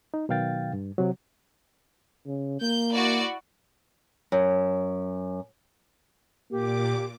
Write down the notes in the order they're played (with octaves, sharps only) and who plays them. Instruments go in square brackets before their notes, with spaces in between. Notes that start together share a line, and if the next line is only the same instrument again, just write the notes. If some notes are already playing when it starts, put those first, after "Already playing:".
[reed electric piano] D#4
B2 D#3 F#3 F5 G5 A6
G2
C3 F#3
[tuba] C#3
[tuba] A#3 [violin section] G6
[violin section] E4 F#4 D5
[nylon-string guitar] F#2
[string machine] A#2 D6 [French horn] A#3 [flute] G4